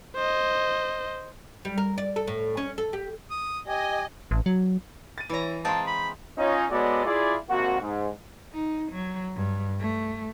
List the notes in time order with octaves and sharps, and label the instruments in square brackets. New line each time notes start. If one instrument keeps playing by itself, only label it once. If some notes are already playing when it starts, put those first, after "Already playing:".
[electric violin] C5 D#5
[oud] G3
A#4
D5
A4
A2
C#4
A4
G4
[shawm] D#6
[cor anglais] G4 [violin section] D#5 [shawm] G#5
[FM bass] A1
F#3
[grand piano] A6 D#7
[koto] E3 A#5 [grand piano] E4 C#5
[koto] G#3 C4 G5 [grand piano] F5 A#5 C6 [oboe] A5
[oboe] B5
[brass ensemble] C#4 D#4 F4
G#3 B3 F#4 A4 C#5 D5
E4 F4 G#4 D5
G#1 C3 A#3 F4 F#4
G#2
[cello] D#4
F#3
G2
A3